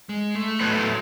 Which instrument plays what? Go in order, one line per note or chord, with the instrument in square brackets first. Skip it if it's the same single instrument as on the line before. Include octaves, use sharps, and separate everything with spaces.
[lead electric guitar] G#3
A3
[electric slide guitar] A2 F#3 B3